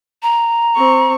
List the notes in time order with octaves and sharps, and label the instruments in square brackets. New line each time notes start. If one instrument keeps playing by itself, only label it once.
[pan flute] A#5
[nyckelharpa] C4 C#6